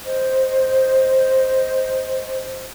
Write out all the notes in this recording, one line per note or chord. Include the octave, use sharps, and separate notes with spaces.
C5 D#5